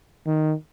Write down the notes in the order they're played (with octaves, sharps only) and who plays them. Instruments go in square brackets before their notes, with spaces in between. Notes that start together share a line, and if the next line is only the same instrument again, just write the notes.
[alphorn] D#3